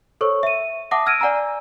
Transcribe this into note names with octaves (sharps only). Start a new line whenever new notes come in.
A4 C5 C#5 C#6 E6
E5 D#7
E5 F#5 A5 D6 D#6 A#6
E6 F6 G#6 A#6 D7 D#7
D5 F#5 G#5 A#5 E6